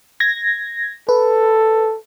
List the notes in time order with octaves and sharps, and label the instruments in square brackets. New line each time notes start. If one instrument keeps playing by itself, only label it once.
[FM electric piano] G#6 A#6
[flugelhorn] A4 [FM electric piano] B4